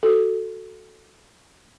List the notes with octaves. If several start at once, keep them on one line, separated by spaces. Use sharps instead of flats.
F#4 A4